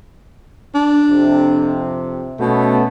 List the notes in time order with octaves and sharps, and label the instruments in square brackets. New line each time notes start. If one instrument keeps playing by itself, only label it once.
[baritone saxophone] D4
[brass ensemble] F2 C3
[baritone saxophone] B2 [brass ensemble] A3 B3 C#4